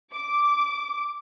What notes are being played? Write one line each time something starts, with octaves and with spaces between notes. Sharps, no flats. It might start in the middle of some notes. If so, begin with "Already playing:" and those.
D6